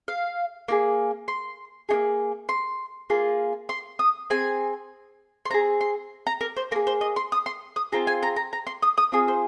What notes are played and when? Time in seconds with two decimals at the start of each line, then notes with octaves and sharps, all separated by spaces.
0.08 F5
0.68 A#3 F4 G#4
1.28 C6
1.89 D#4 G#4
1.93 A#3
2.49 C6
3.10 A#3 F4 G#4
3.69 C6
3.99 D#6
4.30 C4 G#4 G#5
5.45 C6
5.50 C4 D#4 G#4 A#5
5.81 C6
6.27 A#5
6.41 A#4
6.56 C5
6.71 A#3 A#4
6.76 G#4
6.87 C5
7.01 D#5
7.16 C6
7.32 D#6
7.46 C6
7.76 D#6
7.92 C4 F4 G#4 A#5
8.07 G#5
8.23 A#5
8.36 A#5
8.53 A#5
8.67 C6
8.82 D#6
8.98 D#6
9.12 C4 F4 G#4 D#6
9.28 C5